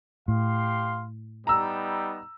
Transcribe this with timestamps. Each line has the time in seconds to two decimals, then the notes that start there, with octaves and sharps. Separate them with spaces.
0.28 A2 G4 F5 C6
1.47 G3 B3 D#4 A#5 E6